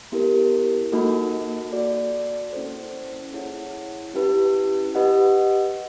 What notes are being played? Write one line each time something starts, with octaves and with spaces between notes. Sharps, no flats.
B3 E4 G4 A#4
A#3 D#4 F#4 A4
F#4 A4 D5
A#3 C#4 E4 A4 C5
E4 G#4 C#5 F#5
C#4 E4 G4 B4
G4 B4 D#5 F#5